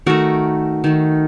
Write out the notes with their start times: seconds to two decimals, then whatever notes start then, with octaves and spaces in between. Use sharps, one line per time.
0.06 D#3 A3 F#4 A#4
0.84 D#3 A3